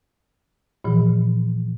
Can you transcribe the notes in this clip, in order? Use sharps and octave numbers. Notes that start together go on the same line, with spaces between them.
A#2 E3 F3